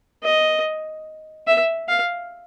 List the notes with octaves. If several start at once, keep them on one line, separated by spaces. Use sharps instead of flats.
D#5
E5
F5